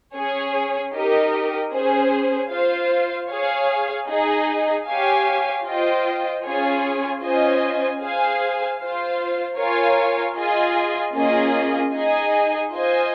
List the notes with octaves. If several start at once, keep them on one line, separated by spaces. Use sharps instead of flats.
C#4 G#4 C#5
D#4 G4 A#4 D#5
C#4 G#4 C5
F4 C5 F5
G#4 C#5 F5
D#4 G#4 D#5
G4 C#5 F5 G#5
F4 C5 D#5 G5
C#4 F4 G#4 C#5 G#5
C#4 F4 C5 D#5 G#5
G#4 C5 F5 G#5
F4 C5 F5
F4 A#4 C#5 F5 G#5
F4 G#4 D#5 G#5
A#3 C#4 F4 G#4 D#5
D#4 G#4 D#5 G#5
F4 C5 D#5 G#5